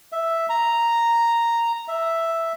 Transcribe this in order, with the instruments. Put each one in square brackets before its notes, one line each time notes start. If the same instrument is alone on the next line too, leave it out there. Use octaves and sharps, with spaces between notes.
[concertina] E5
A#5
E5